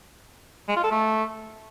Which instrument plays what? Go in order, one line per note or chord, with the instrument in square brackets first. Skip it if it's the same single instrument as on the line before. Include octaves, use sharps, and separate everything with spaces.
[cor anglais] G#3
F4
A4
A3